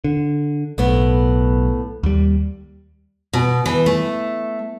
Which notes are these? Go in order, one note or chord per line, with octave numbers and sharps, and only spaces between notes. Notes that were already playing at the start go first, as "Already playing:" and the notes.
D3
B1 A2 B3
D#2 G3
B2
E3
A3